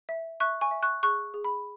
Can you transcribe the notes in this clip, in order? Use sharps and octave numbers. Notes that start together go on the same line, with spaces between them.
E5
E5 C#6 F#6
G#5 C#6
E5
C#6 F#6
G#4 C#6 F#6
G#4
B5